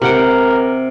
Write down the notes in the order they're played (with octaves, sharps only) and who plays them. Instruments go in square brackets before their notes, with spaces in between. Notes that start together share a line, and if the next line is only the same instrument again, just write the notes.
[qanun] C3 F#5 G5 [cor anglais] A#4